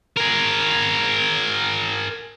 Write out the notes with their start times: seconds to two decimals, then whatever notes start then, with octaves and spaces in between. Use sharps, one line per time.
0.17 G#4 A#4